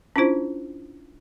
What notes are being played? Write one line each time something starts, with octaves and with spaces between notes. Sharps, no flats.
C#4 D4 E4 F4 C5